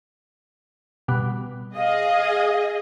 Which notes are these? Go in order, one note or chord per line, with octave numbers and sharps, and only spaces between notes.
B2 G3 B3
G#4 D#5 F5